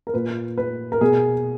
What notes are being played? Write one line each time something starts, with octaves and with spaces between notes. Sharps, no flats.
A#4
A#2 B4
B4
A#4
B2 G#4